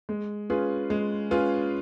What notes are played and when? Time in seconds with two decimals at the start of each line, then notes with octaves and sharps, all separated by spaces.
0.09 G#3
0.50 C#4 F4 G#4 B4
0.90 G#3
1.31 C#4 F4 G#4 B4